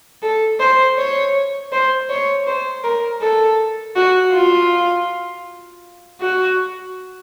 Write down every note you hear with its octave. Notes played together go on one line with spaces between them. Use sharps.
A4
C5
C#5
C5
C#5
C5
A#4
A4
F#4
F4
F#4